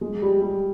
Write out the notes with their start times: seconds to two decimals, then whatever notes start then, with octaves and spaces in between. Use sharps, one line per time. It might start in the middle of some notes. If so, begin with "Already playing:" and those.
0.01 G#3
0.22 G3
0.42 G3